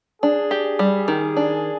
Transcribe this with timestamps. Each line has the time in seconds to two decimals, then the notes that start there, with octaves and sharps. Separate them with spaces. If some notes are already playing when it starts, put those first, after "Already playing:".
0.22 D4 G#4
0.51 G4
0.79 G3
1.08 D#3
1.37 D4